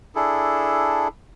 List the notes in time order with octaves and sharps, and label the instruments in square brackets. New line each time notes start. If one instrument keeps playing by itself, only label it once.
[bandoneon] D4 E4 G#4 A4